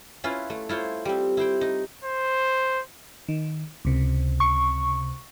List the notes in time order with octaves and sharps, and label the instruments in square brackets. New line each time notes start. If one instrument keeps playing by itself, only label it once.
[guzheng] C#4 E4 F4 B4
A3
E4 F4 C5 C#5
G3 C4
E4 C5 G5
D#4
[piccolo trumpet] C5
[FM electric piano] D#3
C#2 C3
[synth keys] C#6